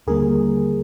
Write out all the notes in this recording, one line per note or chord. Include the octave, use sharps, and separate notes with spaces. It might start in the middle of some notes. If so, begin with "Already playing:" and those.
D#2 D3 G3 A#3 G#4 A#4